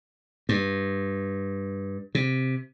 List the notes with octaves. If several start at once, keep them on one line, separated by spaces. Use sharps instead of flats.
G2
C3